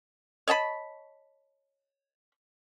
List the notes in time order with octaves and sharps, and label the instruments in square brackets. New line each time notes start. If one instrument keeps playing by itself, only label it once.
[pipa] C#5 D#5 A5 B5